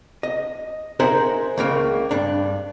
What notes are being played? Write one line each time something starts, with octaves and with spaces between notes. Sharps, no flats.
D#5
D#4 G#4 A#4 C5 E5 F#5
C#2 C#3 A#3
G2 D4